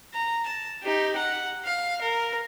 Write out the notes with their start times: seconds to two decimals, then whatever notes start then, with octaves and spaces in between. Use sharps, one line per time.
0.14 A#5
0.46 A5
0.83 D#4 G4
1.16 F#5
1.65 F5
2.01 A#4